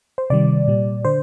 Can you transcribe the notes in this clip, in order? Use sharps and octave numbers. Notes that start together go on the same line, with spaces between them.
C5
C3 D#3 G3 D5
A#2 G3
D3 C5